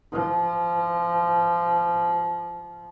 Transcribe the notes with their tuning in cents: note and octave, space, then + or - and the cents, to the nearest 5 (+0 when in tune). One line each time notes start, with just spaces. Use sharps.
F3 -20